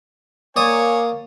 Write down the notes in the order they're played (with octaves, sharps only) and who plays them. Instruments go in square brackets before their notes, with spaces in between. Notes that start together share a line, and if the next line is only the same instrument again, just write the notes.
[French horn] A#3 [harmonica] C#5 G#5 [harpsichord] D5 D#6